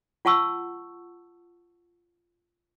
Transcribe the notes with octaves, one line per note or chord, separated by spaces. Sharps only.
F4 F#5 A5 C#6 E6